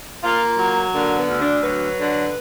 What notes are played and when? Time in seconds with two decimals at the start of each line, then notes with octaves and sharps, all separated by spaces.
0.23 A#3 F4
0.46 F4
0.58 F#3
0.93 D3 A#3
1.16 B3
1.27 D2
1.40 D4
1.63 F#3 B4
1.98 D3